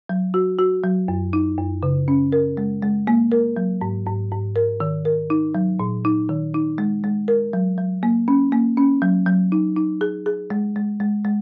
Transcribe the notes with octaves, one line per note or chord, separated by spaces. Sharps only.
F#3
F#4
F#4
F#3
F#2
D#4
F#2
C#3
C#4
A#4
G#3
G#3
A#3
A#4
F#3
G#2
G#2
G#2
A#4
D#3
A#4
D#4
F#3
A#2
D#4
D#3
D#4
G#3
G#3
A#4
F#3
F#3
A#3
C#4
A#3
C#4
F#3
F#3
D#4
D#4
G#4
G#4
G#3
G#3
G#3
G#3